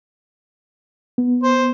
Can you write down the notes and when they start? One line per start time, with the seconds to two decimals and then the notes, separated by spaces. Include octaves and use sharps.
1.18 B3
1.43 C5